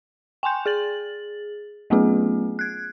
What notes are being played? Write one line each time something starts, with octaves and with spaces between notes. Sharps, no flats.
G5 G#5 C6 G6
G#4 A6 F#7
F#3 A3 B3 C#4 F4 G#4
F#6 G#6